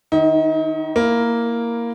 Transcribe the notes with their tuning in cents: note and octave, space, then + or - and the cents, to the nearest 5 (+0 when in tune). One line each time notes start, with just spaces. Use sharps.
D#3 -15 D#4 +35
A#3 +0 E4 +0